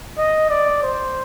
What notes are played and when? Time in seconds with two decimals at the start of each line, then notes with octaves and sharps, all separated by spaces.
0.18 D#5
0.50 D5
0.83 C5